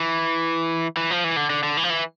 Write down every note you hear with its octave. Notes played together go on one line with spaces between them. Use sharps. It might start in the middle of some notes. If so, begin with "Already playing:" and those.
Already playing: E3
E3
F3
E3
D3
D3
D3
E3
F3
E3